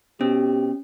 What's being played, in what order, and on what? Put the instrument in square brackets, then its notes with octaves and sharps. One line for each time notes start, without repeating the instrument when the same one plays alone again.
[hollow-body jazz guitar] B2 C4 [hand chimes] C#4 [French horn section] G4